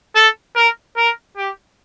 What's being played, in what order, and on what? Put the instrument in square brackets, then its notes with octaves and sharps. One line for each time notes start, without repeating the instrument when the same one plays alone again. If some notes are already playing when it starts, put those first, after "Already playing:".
[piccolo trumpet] A4
A#4
A#4
G4